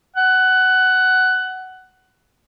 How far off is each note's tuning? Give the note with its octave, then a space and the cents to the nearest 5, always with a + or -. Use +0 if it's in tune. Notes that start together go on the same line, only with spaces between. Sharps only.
F#5 +15